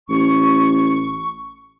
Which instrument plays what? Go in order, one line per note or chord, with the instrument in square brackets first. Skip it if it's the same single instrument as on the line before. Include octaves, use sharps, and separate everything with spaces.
[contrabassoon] A1 [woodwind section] C#6